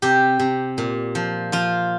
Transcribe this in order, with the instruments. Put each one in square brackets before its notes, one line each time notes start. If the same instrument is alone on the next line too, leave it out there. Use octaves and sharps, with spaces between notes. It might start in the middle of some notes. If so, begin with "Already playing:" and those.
[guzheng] C3 G4
C3
A#2
F3
F3 F4